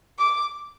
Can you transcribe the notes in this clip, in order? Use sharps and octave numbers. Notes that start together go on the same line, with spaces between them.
D6